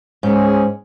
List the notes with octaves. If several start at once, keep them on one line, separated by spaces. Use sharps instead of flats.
G#2 C#4 G#4